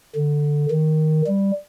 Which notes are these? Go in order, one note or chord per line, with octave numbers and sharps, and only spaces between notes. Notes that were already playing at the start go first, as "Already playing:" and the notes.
D3
D#3
G3